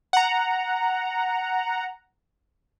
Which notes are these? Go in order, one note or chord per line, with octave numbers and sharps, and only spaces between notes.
F#5 A#5